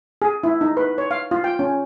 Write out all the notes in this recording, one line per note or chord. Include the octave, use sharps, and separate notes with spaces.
G#4
E4
D#4
B4
C#5
F5
F4
G5
C#4